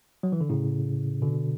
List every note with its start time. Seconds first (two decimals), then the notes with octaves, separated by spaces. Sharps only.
0.23 F#3
0.32 E3
0.41 D3
0.49 A2 C#3
1.22 B2 D3